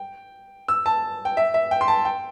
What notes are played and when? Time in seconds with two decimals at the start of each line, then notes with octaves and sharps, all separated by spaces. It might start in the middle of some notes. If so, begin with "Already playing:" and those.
Already playing: G5
0.68 E6
0.86 A5
1.25 G5
1.37 E5
1.54 E5
1.71 G5
1.81 C6
1.88 A5
2.05 G5